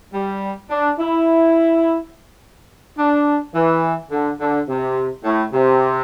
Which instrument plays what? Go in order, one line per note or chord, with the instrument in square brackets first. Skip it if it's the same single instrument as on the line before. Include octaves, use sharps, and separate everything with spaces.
[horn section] G3
D4
E4
D4
E3
D3
D3
C3
A2
C3